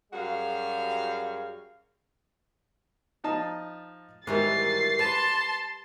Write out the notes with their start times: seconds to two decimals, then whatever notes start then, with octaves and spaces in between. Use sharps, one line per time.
0.12 F#2 G3 F#4 G#4 F5
3.24 F3 D#4 A5
4.27 G#2 D#3 E3 G3 A6 C7
4.99 B4 A5 C6